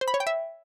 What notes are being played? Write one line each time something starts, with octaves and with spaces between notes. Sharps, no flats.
C5
B5
C#5
G5
E5